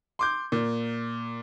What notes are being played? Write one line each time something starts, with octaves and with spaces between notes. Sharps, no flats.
C6 D6 G6
A#2